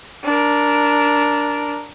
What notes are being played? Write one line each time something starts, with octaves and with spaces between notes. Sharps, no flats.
D4 A#4